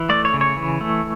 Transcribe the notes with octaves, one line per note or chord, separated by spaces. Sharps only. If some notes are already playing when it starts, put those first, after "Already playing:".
Already playing: E3
A3 D5
C#5
C#3
C#5
E3
A3